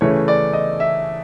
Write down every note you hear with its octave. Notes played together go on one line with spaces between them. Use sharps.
C#3 E3 A3 C#5
D5
D#5
E5